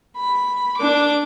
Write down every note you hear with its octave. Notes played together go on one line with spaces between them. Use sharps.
B5
D4 D6